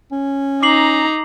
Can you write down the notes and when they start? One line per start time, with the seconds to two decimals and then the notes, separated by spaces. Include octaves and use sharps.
0.12 C#4
0.63 D#4 A#5 D6 C7 F#7